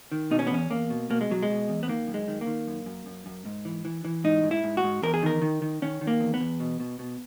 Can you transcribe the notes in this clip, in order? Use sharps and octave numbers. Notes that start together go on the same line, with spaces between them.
D#3
B2 D#4
C#4
B3
E2 C#4
E2 A#3
B2
B2 A#3
G#3
B2 F#3
G#3
B2
E2
B3
D#3 A#3
F#2
G#3
D#3
A#3
D#3
F#2
F#2
F#2
F#2
G#2
E3
E3
E3
G#2 D#4
G#2
E4
G#2
F#4
G#2
E2 A#4
G#4
D#3 A#4
D#3
D#3
D#3 C#4
D#3
A#3
E2
B3
E2
B2
B2
B2